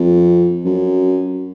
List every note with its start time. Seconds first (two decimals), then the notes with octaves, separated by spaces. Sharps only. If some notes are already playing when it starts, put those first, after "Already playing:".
Already playing: F2
0.65 F#2